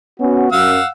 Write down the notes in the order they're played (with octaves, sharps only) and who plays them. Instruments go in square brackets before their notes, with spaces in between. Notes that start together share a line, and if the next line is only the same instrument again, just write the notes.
[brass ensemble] B3 C#4 F#4
[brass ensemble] F#2 [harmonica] F5 F#5 E6